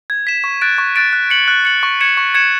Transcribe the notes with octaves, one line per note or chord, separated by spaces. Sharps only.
G#6
B6 E7
C#6
F#6 A6 D7
C#6
F#6 A6 D7
F#6
C#7 F#7
F#6
C#7 F#7
C#6
G#6 C#7 E7
C#6
G#6 C#7 E7